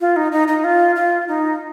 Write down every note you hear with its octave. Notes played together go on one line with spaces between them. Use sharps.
F4
D#4
D#4
D#4
F4
F4
D#4